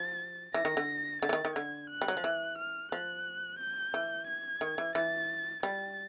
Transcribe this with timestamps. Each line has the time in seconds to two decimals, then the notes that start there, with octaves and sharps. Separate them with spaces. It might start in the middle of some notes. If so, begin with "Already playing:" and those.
Already playing: F3 A6
0.54 E3 A#6
0.65 D#3
0.77 D3
1.22 D3 A6
1.29 E3
1.33 D#3
1.45 D#3
1.55 D3 G#6
1.90 F#6
2.02 G3
2.08 F#3
2.17 F3
2.24 E3
2.58 F6
2.92 F3 F#6
3.59 G6
3.94 E3
4.27 G#6
4.61 D#3
4.78 E3
4.95 E3 A6
5.63 G3 A6